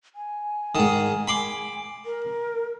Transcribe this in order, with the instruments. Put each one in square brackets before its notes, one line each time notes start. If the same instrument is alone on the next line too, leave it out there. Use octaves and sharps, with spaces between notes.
[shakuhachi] G#5
[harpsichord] G#2 D#3
B5 C6 D6
[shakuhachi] A#4